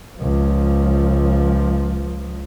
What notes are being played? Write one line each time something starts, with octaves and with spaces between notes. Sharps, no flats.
C#2 F3